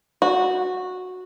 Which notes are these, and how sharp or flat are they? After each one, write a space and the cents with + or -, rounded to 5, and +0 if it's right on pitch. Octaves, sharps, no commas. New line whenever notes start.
F#4 -10